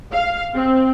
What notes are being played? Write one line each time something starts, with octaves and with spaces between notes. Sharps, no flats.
F5
C4